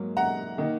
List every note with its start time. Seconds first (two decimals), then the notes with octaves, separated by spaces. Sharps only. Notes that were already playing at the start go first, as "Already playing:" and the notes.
Already playing: G#2 F#3 A#3
0.17 F#5 A#5
0.58 D#3 A#3